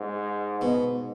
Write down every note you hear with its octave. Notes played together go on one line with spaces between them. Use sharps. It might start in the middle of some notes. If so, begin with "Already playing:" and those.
Already playing: G#2
G#2 B2